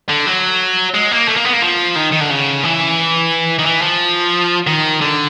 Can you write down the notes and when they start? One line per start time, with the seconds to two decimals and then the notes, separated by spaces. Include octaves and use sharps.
0.09 D3
0.26 F#3
0.94 G#3
1.11 A#3
1.28 A3
1.36 A#3
1.44 B3
1.53 A#3
1.62 F3
1.96 D#3
2.12 D#3
2.21 D3
2.30 C#3
2.64 E3
3.59 D#3
3.65 E3
3.82 F3
4.67 D#3
5.01 D3